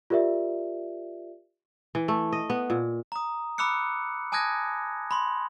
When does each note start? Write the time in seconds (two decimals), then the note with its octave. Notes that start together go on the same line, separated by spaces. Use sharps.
0.10 F4 G4 A#4 D5 E5
1.95 E3
2.08 A3
2.33 D#5
2.50 B3
2.70 A#2
3.12 A#5 D#6
3.58 B5 D6 E6 F#6 C#7
4.32 G#5 A5 D#6 F#6 G#6 A#6
5.11 B5 C6